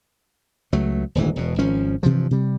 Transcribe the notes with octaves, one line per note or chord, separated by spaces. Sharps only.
C#2 F#3 A3
D#1 G#1 D2 E3
E1 B2
G#1 F3 C#4
G2 C3 E3 F3
C3 G3